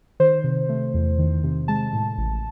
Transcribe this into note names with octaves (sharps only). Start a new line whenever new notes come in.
D#3 C5
C3
A3
E2
D#3
C3
G#3 A5
A2
A1